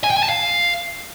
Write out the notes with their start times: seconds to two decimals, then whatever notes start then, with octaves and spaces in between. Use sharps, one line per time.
0.04 G#5
0.10 G5
0.17 G#5
0.23 A5
0.29 F5